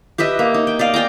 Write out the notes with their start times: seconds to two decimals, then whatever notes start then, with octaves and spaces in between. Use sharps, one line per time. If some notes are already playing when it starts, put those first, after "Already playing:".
0.18 G4 B4 D#5 E5
0.39 A#3
0.54 D#4
0.67 G5
0.79 D5 D#5 F5
0.94 D5 G5 G#5 A#5